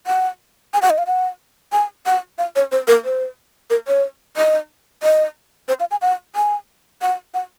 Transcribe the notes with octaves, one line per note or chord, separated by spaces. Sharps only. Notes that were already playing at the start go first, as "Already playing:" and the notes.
F#5
G#5
F#5
D#5
F5
F#5
G#5
F#5
F5
C#5
C5
A#4
C5
A#4
C#5
D#5
D#5
C5
F5
G#5
F#5
G#5
F#5
F#5